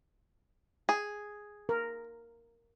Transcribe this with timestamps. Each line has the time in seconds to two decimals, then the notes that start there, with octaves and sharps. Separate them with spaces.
0.89 G#4
1.69 A#4